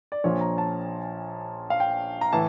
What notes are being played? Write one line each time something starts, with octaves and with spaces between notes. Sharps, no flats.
D5
A#1 A#2 F3 C#5
A#5
A5
F5
G5
A#5
A2 E3 A5